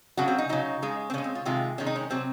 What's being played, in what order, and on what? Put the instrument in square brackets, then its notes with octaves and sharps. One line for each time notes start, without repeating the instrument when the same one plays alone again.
[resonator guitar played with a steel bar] C#3 F#3 F#4
C4
D#4
C#3 F#3 D#4
C#3 G#3
C4
C#3 C#4
G#3
C4
F4
C3 D#3 G#3 F4
C3 D#3 G#3 C#4
D#4
C#4
C3 F#3 C4